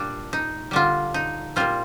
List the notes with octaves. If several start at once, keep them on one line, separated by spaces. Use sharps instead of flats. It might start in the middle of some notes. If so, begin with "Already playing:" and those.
Already playing: A#2 G3 D4
D#4
D3 G3 D4 F4
D#4
A#2 G3 C4 F4